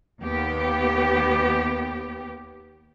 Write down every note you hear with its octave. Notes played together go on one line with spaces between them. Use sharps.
D#2 B3 G4